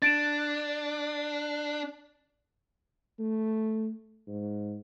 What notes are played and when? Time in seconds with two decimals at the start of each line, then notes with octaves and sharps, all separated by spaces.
0.02 D4 A6 D7 E7
3.19 A3
4.27 G#2